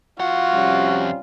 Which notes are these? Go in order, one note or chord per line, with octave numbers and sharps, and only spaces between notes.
F2 F4 F#4 F#5
C3 G3 C#4